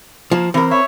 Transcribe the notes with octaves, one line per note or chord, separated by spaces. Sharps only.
F3 A#3
E3 C4 A#4
C#5 E5